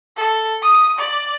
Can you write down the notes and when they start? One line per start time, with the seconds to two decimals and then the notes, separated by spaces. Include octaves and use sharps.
0.17 A4
0.62 D#6
0.98 D5